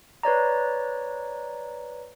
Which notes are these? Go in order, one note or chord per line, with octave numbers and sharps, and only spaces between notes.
B4 C#5 D5 A#5